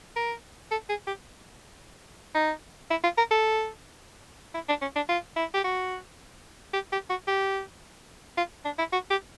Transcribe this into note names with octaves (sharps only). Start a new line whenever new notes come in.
A#4
A4
G#4
G4
D#4
E4
F4
A#4
A4
E4
D4
C#4
D4
F4
E4
G4
F#4
G4
G4
F#4
G4
F4
D4
E4
F#4
G4